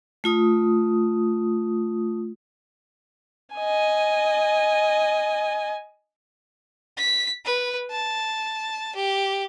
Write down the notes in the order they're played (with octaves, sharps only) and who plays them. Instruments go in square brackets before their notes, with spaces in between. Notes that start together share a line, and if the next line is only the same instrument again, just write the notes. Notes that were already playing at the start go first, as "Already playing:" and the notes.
[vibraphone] A3 F4 D#6
[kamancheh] D#5 G#5
[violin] B6
B4
A5
G4